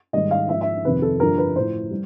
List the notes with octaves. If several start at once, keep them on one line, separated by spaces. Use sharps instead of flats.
G#2 D#3 G3 D#5
F5
G#2 F3 E5
E5
F2 C3 D#3 B4
A4
G2 D3 F3 A#4
B4
A2 F3 C5
G3